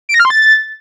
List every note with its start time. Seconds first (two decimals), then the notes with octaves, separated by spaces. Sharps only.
0.09 D7
0.14 A#6
0.20 F6
0.25 C6
0.30 A6